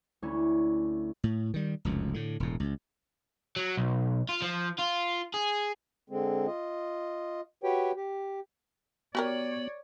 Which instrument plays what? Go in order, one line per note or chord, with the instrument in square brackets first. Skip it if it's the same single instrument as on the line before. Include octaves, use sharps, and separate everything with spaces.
[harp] D2 C#4 E4
[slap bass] A2
D#3 G3
F1 C#2 F#2
A2 D3
E1 A2
C#2
[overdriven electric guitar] F#3
B1
F4
F3
F4
G#4
[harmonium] D3 G#3 C4
F4 D#5
F#4 G4 B4 C#5 G5
G4
[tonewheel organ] B3 [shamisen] F#4 G4 A#4 [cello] C#5 D5